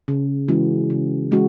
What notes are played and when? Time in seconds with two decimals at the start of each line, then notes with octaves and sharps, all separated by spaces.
0.08 C#3
0.48 E3 G#3 C#4 F#4
0.90 C#3
1.31 E3 G#3 C#4 F#4